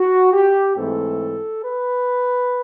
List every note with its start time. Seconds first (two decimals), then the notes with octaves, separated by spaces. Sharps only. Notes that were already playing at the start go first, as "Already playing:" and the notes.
Already playing: F#4
0.33 G4
0.77 G#2 E3 A3 C4 A4
1.63 B4